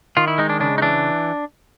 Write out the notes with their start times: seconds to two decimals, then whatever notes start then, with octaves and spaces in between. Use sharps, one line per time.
0.17 D#3 F4
0.28 E4
0.38 G#3 D#4
0.49 D4
0.60 C#3 D4
0.78 D#4
0.82 E3 D4